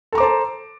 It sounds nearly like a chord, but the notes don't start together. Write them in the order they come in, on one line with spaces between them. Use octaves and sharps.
A4 A#5 D6 C5 A5